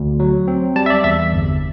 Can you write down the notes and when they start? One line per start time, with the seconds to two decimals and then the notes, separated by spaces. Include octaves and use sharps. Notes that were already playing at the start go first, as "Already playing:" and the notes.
Already playing: D2
0.20 F#3
0.48 C4
0.76 G3 A5
0.86 E5
0.90 D5
1.04 E2 E5
1.32 G1